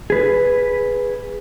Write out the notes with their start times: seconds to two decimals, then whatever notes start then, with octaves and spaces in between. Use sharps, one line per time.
0.10 G#4 B4